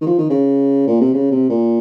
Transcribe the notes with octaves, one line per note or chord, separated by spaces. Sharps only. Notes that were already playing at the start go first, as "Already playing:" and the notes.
D#3
F3
D#3
C#3
A#2
C3
C#3
C3
A#2